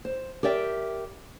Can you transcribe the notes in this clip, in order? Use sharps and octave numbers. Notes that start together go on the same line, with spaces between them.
C5
G4 A#4 D5 E5 G5